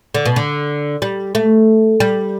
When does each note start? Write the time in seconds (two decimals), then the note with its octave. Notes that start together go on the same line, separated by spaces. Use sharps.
0.15 D3
0.26 B2
0.36 D3
1.02 G3
1.35 A3
2.00 G3